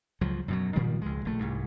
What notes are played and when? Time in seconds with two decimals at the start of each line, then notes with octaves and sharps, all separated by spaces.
0.21 C#2 F3 F#3
0.48 F#2 B2 F#3
0.76 A#2 D#3 F3 G3
1.02 C#2 G#3
1.25 A#1 A3
1.40 C2 G#2